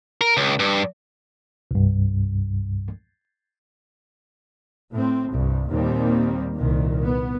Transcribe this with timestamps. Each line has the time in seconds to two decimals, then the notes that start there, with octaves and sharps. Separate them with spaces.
0.21 A#4
0.37 C#2
0.60 G2
1.71 C2 G2
4.92 A2 C4
5.32 C2 G2
5.69 D#2 A#2 D#3 G3 A#3 C4
6.55 C2 A#2 D#3
7.03 B3